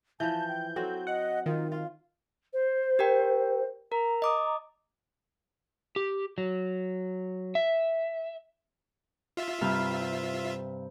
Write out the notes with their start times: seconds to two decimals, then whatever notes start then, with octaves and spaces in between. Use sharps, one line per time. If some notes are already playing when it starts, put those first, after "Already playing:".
0.20 E3 F3 A5 G6
0.48 G5
0.76 F#3 C4 F#4 A4
1.07 D#5 F#5
1.46 D#3 F4
1.72 F4 F5
2.53 C5
2.99 G4 A#4 G5
3.92 A#4 A#5
4.22 D#5 D6 D#6
5.96 G4
6.38 F#3
7.55 E5
9.37 F4 E5
9.61 G2 C3 F5